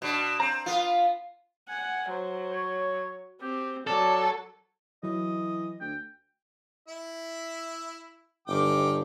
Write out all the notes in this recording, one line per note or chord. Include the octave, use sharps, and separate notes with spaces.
B2 D4
C4 A#5
B3 F4
F#5 G#5
F#3 C5
C#5
C4 G4
F#3 A4 D5
E3 F#3 D#5
D2 G5
E4 E5
G1 D#3 G5 D6